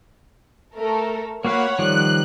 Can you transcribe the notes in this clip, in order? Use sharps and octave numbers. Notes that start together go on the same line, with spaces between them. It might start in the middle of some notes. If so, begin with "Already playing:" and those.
A3 A4 A#4
A#3 F#4 C#5 F5 F#5 B5
D#3 F3 G3 F#6